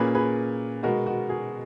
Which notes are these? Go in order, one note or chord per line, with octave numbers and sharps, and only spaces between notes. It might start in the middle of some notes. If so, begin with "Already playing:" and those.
Already playing: A#2 A#3 C#4 G#4 B4
G#4 B4
B2 G#3 B3 F#4 A#4
F#4
G#4